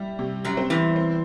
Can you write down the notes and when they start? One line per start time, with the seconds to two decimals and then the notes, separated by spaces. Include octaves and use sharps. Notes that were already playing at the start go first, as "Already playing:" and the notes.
Already playing: G3 E4
0.19 C3
0.45 F#2 F#3
0.57 C4
0.70 E2 E3
0.96 C4